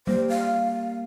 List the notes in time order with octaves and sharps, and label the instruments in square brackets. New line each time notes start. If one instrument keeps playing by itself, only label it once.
[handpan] G3 [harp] A#3 [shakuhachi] C5
[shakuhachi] F5